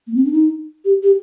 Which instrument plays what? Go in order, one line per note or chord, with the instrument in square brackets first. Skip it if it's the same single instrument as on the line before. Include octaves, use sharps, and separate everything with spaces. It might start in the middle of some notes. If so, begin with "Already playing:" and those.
[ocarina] A#3
C4
D4
D#4
G4
G4